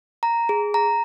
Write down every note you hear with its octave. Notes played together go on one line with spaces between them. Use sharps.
A#5
G#4
A#5